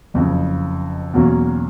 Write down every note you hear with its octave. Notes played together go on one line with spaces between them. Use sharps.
F#1 F2 C#3
E2 B2 F#3 A#3 C#4